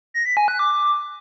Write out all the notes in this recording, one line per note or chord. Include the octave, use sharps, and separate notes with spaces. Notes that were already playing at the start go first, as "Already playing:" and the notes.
A#6
B6
G#5
F#6
D6